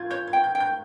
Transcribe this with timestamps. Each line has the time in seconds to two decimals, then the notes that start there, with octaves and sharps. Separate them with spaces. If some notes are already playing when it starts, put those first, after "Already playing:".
Already playing: F4 G6 G#6
0.10 C#5 G6
0.28 G#6
0.33 G5
0.44 G6
0.55 G5
0.60 G6